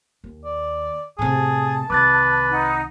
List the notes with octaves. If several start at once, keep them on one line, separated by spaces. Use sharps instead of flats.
D#2
D5
A2 C3 G#4 A5
C2 D#3 B4 D6 F#6 A6
D#4 F#5